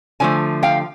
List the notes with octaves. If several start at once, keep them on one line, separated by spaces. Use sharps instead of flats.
D3 F3 A3 G#5
F5 G5